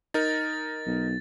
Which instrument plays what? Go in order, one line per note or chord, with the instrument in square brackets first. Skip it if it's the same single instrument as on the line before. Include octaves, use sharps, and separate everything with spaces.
[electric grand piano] D#4 A#4 [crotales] A6
[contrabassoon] B1